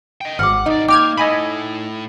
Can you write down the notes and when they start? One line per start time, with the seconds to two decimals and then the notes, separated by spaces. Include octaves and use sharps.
0.21 D#5 G5
0.39 G#1 F#5 D6 F6
0.66 B1 D#4 D5
0.89 A#3 G5 D6 F6 G#6
1.18 A2 A4 D#5 G#5 B5